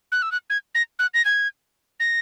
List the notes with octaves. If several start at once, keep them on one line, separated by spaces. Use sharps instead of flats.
F#6
E6
F#6
G#6
A#6
F#6
A#6
G#6
A#6